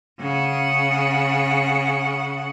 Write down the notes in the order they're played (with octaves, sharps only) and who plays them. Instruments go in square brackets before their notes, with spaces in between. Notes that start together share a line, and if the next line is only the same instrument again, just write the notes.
[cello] C#3 F#5